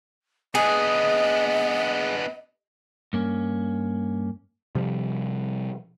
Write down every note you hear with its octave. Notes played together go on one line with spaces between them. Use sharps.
B3 D4 G#4 D#5
G2 A#3 C#4
C3 F3 G3